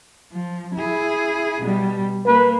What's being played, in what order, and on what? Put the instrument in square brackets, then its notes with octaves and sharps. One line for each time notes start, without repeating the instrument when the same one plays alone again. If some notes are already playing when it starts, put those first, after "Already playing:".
[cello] F3
E4 G#4
B2 G3
[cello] A#3 [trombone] B4